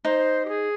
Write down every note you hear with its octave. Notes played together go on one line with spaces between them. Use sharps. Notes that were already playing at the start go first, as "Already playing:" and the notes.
D#4 C5 D#5
G4
G#4